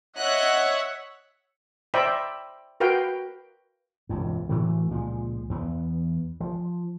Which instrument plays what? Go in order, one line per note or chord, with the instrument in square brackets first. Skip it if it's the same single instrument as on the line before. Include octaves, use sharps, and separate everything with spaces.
[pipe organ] C#5 E5 F#5 [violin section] D#5 F#6
[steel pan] C5 D5 E5 G5 A#5 B5
F#4 A#4 B4 F5 G5
[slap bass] E1 C#2 G2
A2 E3 F#3 A3
C#2 A#2 F3 G#3
E2 B3
F3